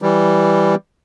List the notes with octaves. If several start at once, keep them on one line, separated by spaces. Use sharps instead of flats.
E3 G3